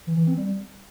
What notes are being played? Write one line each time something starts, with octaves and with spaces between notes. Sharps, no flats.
E3
E3
C4
G3